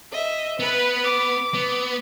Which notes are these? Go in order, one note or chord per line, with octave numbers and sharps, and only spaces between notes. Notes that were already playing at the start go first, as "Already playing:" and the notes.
D#5 E5
B3 B4
D6
B3